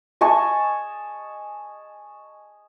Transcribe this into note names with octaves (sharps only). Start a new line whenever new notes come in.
D#5 G#5 A5 C#6